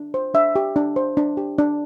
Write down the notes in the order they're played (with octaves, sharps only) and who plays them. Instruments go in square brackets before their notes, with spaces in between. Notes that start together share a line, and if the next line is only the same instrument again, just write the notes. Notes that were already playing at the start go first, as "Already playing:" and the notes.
Already playing: [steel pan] D4
C5
D4 E5
G4
D4
C5
D4
G4
D4